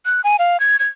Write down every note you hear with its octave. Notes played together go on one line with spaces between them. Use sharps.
F#6
G#5
F5
G#6
G#6